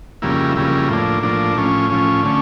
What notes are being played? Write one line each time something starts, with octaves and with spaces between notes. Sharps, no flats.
F2 C#3 G3 A#3 E4
F2 C#3 G3 A#3 E4
A2 F3 A#3 D4
A2 F3 A#3 D4
A2 F3 C#4
A2 F3 C#4
D3 A3 C#4